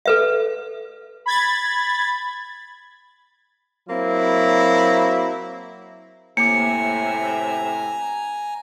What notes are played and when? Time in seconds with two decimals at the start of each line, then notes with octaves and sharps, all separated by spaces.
0.06 A4 B4 E5
1.26 B5 G#6 A6
3.89 F#3 A#3 C4 E4
6.37 A2 C3 A#3 E5 G#5 A#5 D6 C#7